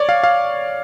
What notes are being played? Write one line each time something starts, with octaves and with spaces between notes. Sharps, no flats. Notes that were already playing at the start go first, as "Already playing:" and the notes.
Already playing: C#5 D5
F5
F5